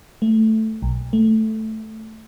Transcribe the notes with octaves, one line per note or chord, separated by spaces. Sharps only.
A3
B1
A3